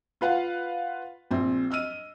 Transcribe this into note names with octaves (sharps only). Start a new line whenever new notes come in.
F4 B4 F5 F#5
A#1 C4
D#5 E6 F6 D#7